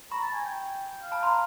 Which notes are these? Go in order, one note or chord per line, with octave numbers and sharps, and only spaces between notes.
A#5 B5 C#6
A5
G#5
G5
F5
A5 B5
A#5 C6